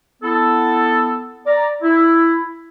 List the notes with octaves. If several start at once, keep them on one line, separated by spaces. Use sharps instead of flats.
B3 E4 A4
D5 A#5
E4